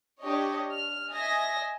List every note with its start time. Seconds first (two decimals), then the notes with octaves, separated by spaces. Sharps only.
0.22 D4 G4 C#5 D#5
0.71 F6
1.12 D#5 E5 G#5 A#6